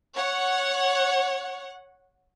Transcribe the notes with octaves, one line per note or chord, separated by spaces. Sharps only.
C#5 F#5